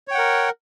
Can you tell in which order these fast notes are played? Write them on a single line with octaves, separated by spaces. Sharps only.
C#5 G5 F#5 A#4